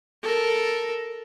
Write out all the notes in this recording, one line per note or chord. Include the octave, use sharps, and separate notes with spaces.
A4 A#4